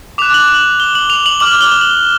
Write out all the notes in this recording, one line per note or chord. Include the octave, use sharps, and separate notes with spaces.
D6 F#6 F7
F#7
F#7
G7
F#7
F7
F#7
D6 F6 F#7
G7
F#7